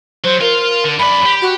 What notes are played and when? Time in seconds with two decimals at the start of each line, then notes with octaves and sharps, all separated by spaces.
0.24 F#3 C5
0.41 F4 A#4
0.84 D3
0.99 F#2 D5 B5
1.25 G4
1.42 F#4